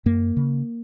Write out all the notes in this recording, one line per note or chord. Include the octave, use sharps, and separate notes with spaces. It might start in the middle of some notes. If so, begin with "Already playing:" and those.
F#2 A#3
C#3